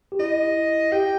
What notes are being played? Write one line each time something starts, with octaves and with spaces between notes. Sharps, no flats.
G4
E4 D#5
G4 G5